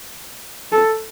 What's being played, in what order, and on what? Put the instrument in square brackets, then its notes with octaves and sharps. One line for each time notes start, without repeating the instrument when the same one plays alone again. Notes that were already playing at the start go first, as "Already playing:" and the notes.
[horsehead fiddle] A4